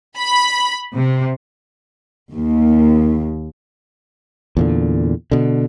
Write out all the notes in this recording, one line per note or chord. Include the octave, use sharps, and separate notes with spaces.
B5
C3
D#2
E2 A#2 D3
B2 D3